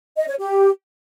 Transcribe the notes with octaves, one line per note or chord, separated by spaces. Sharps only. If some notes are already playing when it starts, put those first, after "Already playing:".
D#5
C#5
G4